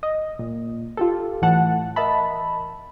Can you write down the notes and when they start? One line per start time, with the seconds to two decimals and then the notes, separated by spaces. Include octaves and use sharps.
0.03 D#5
0.39 A#2
0.97 F4 G4 A4
1.42 A2 E3 F#5 A5
1.96 A#4 D#5 E5 A5 B5